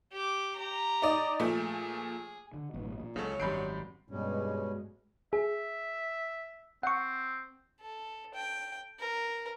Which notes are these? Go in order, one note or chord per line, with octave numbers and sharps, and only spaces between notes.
G4 D6
G4 A#5
D#4 D5 D#6
A#2 F3 A3 G#4
D3
A1 F#2 B2
A#2
C#2 C#3 F#3 C#4 A4
G#1 F#2 G3 B5 G6 C7 D7
G2 B2 G3 G#3 C#4
G#4 E5
C4 F#5 C#6
A4
G5
A#4